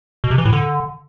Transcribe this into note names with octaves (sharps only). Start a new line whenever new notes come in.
B2
C3
E3
A2
D3